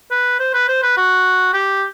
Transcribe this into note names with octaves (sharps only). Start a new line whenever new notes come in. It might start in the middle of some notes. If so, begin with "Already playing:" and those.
B4
C5
B4
C5
B4
F#4
G4